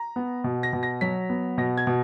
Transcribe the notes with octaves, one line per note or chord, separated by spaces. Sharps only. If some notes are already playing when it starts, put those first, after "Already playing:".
Already playing: A#5
B3
B2
A#6
B2
A#6
F#3 B6
B3
B2 A#6
G#6
B2